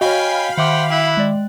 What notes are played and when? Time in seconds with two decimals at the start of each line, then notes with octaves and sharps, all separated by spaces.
0.01 F#4 C#5 D#5 F5 G5 G#5 B5
0.58 D#3 C5 E5 F#5 G5 D6
0.90 E4 G5 F#6
1.17 G#3 D5